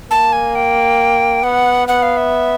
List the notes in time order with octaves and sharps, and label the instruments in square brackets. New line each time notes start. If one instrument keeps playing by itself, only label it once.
[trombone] A#3 [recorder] A5
[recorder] G#5
G5
[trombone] B3 [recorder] F#5
[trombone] B3 [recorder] F#5
[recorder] F5
E5